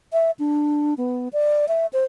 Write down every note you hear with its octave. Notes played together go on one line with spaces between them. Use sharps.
E5
D4
B3
D5
E5
C5